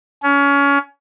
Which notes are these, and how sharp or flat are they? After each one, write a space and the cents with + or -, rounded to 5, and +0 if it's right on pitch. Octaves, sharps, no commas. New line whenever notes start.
C#4 +25